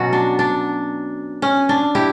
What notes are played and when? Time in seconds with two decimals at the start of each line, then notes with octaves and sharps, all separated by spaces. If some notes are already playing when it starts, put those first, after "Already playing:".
Already playing: B2 F#3 C#4 F#4
0.13 D4
0.39 D4
1.42 C#4
1.69 D4
1.95 E4 G4